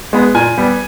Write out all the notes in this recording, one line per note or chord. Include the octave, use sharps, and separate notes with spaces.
G#3 B3
A#2 G#5
G3 B3